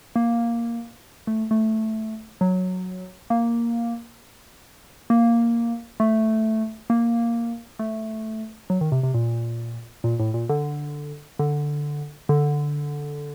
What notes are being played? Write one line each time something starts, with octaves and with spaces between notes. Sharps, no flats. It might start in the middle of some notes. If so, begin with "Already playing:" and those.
A#3
A3
A3
F#3
A#3
A#3
A3
A#3
A3
F#3
D#3
C3
C3
A#2
A#2
A2
A#2
D3
D3
D3